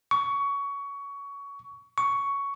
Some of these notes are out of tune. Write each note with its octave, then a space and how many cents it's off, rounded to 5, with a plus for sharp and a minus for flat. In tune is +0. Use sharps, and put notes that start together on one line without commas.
C#6 +20
C#6 +10